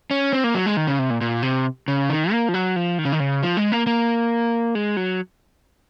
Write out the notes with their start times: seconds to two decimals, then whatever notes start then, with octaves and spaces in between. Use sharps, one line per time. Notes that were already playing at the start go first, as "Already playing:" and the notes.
0.11 C#4
0.33 C4
0.44 A#3
0.55 F#3
0.66 G#3
0.77 D#3
0.87 C#3
0.99 C3
1.10 A#2
1.21 A#2
1.43 C3
1.88 C#3
2.10 D#3
2.32 A#3
2.49 F3
2.54 F#3
2.76 F3
2.99 D#3
3.05 C#3
3.12 D#3
3.20 C#3
3.43 F3
3.57 G#3
3.72 A#3
3.87 A#3
4.75 G#3
4.97 F#3